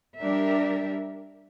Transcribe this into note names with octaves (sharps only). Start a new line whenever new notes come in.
G3 D4 G4 A#4 E5